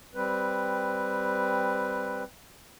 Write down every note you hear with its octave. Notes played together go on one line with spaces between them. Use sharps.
G3 C4 B4